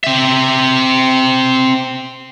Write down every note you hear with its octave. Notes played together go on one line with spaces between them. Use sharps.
C4 E5